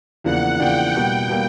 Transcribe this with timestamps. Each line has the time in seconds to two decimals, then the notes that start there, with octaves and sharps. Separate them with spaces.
0.24 E2 C#3 F3 A#3 D4 F#5
0.59 E2 C#3 F3 A#3 D4 G5
0.94 B2 G3 A#3 G5
1.29 B2 G3 A#3